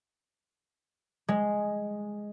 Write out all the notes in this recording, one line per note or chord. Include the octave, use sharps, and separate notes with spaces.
G#3